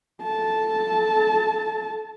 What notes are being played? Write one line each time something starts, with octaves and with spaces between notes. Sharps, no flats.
A4 A5